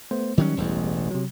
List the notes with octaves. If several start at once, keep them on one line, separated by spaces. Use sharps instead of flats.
A3 B3 C5
D#3 F#3 G3 C#4
E1 A1 E2
C3 F#3